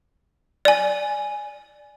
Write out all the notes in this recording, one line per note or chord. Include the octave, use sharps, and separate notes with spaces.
D5 G#5